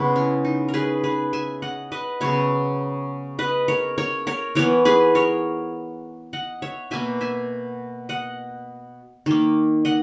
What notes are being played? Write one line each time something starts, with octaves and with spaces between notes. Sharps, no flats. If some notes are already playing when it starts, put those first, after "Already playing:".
Already playing: C#3 G#3 B3 E4
C#4
D#4
A#4
G#4 B4
G#4 B4
E5 G#5
D#5 F#5
B4 D#5
C#3 F#3 B3 C#5 E5
B4 D#5
A#4 C#5
A#4 C#5
A#4 C#5
E3 B3 A#4 C#5
G#4 B4
A#4 C#5
D#5 F#5
C#5 E5
B2 A#3 E5 G#5
E5 G#5
D#5 F#5
D#3 A#3
D#5 F#5